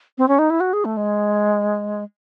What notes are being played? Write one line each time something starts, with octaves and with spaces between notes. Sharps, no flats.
C4
C#4
D#4
E4
F#4
G#4
A3
G#3